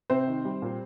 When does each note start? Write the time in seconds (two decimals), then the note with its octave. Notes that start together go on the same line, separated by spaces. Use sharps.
0.10 C3 C4 C5
0.27 D#3
0.45 G3
0.62 A#2